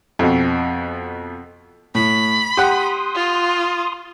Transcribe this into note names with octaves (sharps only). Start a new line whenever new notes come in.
F2 B2
A2 B5
G4 F#5 C6 D#6
F4